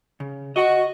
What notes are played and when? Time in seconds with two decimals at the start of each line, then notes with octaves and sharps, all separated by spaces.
0.20 C#3
0.56 F#4 D#5